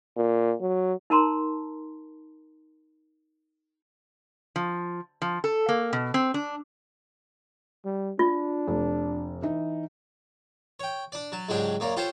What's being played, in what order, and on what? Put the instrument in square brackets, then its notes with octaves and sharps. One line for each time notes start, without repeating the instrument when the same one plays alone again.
[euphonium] A#2
F#3
[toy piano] D#4 A#4 A5 A#5 C6
[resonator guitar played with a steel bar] F3
F3
A4
A#3
B2
C4
D4
[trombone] G3
[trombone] D4 [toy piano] F4
[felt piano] F1
E3 D#4
[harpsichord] C#5 G5
D4 D5
F#3 A5
C#2 G#2 F#3 G#3 D4 G4
F#2 A#3 C#5 D5
F4 G4 A4 C5 C#5 A5